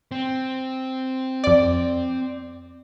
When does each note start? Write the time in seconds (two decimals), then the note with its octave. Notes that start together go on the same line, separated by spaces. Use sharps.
0.12 C4
1.44 F2 D5